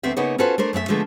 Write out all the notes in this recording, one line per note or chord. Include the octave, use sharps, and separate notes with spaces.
D2 B3 C4 E5
C#3 A#3 B3 D#4 C#5
C#4 F4 F#4 A4 B4 C5
A3 D4 A#4 C5
F#2 A3 B4 E5
D3 F3 G#3 A3 B3